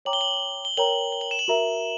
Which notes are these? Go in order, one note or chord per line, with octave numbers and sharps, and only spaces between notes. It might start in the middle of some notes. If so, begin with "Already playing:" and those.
C#5 G5 A#5 D6 F#7
G7
F#7
G7
A#4 C#5 G5 A#5 F#7
G7
F#7
E7
F#7
F#4 A#4 E5 A#5